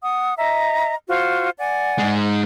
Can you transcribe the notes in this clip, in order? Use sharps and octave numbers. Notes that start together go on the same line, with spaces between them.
F#5 D#6
D#5 E5 A#5
F4 F#4 C5
D5 F#5 G#5
G#2 G#3